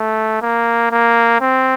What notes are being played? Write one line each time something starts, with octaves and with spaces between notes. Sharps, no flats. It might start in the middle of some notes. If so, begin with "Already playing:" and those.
Already playing: A3
A#3
A#3
C4